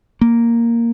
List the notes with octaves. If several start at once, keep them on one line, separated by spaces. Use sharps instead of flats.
A#3